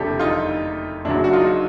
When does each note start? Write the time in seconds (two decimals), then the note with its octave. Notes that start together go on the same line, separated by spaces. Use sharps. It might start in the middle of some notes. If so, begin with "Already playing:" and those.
Already playing: F#1 F2 C3 D4 E4 G4 A4
0.19 D#4 F4
1.05 F#1 F#2 C#3 F#3 D4 E4
1.24 F#4
1.33 D#4 F4